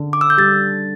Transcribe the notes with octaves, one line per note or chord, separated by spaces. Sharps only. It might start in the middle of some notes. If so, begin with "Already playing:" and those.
Already playing: D3 D4
D6
E6
G6
G3 A6